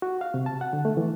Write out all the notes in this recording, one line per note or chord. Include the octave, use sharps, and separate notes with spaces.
F#4
F5
C3
A5
F#5
D3
A3
E3